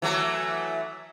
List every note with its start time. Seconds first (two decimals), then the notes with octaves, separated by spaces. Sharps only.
0.02 E3 F#3 A3